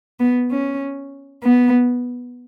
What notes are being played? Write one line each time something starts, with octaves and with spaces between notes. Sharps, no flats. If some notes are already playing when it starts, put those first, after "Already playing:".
B3
C#4
B3